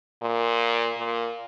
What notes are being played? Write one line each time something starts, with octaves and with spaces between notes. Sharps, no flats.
A#2
A#2